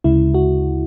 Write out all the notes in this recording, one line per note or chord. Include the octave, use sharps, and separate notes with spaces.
D2 C#3 G#3 E4
F#4